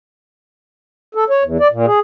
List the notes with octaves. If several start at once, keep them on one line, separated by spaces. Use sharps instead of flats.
A4
C#5
E2
D5
A#2
G#4